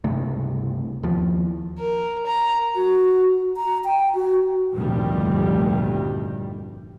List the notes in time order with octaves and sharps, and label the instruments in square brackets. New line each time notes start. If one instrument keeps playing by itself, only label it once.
[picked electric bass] C#2 G2 C3 A3
D#2 F3
[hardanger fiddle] A#4
A#5
[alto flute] F#4
A#5
G5
F#4
[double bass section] F1 D2 G2 A#2 D#3 G3